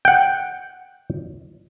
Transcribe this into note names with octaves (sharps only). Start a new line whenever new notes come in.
F#5 G5